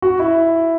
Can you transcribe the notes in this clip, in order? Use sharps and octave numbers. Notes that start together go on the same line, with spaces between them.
F#4
E4